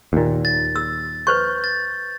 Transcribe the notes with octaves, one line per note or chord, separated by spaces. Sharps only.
D#2 A#2
A6
E6
B4 C5 C#6 G6
A6